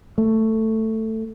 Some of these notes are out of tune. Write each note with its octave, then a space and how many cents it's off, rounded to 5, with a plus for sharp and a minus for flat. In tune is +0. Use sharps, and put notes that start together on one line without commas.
A3 +10